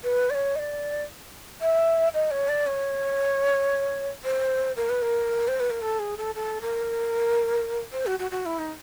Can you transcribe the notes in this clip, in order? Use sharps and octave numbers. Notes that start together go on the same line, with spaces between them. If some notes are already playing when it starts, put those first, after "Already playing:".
B4
D5
C#5
D#5
D5
E5
D#5
C#5
D5
C#5
C5
A#4
B4
A#4
C5
B4
A#4
A4
G#4
A4
A4
A#4
C5
F#4
F#4
F#4
E4
D#4